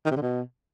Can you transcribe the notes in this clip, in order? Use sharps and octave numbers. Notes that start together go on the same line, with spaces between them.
D#3
C3
D3
B2